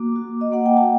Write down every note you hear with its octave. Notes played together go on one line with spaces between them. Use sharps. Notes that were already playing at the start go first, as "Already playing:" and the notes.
Already playing: A#3 F#4 D6
F#4
D#5
A#3 F#5
G5
A5